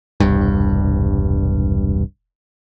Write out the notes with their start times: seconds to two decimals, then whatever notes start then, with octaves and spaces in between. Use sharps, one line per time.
0.20 E1 C2 G2